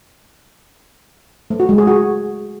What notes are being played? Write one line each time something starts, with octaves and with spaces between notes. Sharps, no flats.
A3
F#4
G#3
G#4
F#4